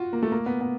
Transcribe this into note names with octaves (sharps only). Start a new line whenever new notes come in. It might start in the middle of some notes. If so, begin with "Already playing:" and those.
Already playing: F4 F#4
A#3
A3
A#3
B3
B3